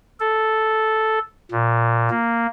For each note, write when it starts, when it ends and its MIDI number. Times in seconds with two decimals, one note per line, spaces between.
0.20 1.19 69
1.51 2.09 46
2.10 2.46 58